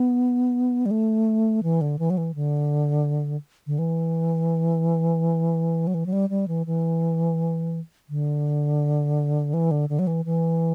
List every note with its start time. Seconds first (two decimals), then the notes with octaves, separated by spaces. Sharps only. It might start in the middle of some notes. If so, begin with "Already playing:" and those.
Already playing: B3
0.86 G3
0.91 A3
1.63 E3
1.81 D3
1.99 E3
2.10 F#3
2.17 E3
2.35 D3
3.67 D3
3.79 E3
5.87 F#3
5.94 E3
6.06 F#3
6.13 G3
6.30 G3
6.48 E3
6.66 E3
8.09 D3
9.54 E3
9.71 D3
9.89 D3
9.99 F#3
10.07 E3
10.25 E3